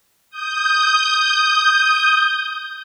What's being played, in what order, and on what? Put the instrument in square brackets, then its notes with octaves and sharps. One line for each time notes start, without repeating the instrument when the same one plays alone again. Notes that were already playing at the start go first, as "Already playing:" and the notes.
[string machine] D#6 G6